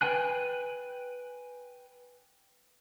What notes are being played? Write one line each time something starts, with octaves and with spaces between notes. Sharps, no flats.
B4 G5 G#5 F#6